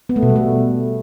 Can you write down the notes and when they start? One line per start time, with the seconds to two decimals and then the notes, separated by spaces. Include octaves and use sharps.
0.09 B3
0.16 A3
0.23 B2
0.29 G3
0.36 A3